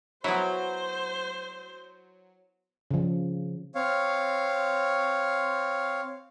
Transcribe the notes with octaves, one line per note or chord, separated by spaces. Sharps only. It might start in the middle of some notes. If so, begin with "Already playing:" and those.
F#3 B3 E4 C5
C#3 F3
C4 C#5 F5